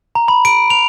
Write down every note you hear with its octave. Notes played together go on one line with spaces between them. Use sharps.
A#5
B5
D7
F7